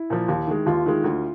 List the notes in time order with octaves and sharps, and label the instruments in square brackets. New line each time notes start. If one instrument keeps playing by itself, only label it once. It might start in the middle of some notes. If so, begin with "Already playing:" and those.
Already playing: [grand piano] E4
[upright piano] A#2 F3
D#2
D#3 G#3
[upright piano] D#2 [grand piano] F4
[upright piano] D#3 G#3
D2